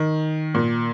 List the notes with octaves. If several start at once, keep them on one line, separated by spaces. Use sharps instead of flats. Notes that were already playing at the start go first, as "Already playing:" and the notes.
Already playing: D#3
A#2